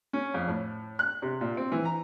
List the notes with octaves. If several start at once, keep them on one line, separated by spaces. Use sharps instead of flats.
C#4
F2
A2
F#6
C3
A#2
C4
E3
A#5